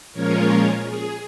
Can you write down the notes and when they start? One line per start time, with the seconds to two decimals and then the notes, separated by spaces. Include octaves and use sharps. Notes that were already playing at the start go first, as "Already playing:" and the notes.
0.13 A#2 F3 G#3 C#4 F4 A#4 C#5
0.84 G#4